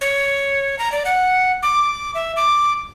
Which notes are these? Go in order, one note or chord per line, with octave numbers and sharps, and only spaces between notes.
C#5
A#5
D5
F#5
D6
E5
D6